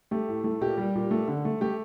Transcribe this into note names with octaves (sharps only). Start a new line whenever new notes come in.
A3 G4
A2
A3
A#2 G4
G3
A#2
A3
D3
A3
A3 G4